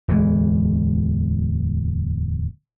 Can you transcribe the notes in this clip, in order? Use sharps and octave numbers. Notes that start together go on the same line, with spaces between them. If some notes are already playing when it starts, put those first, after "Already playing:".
D1 E2 E3 G#3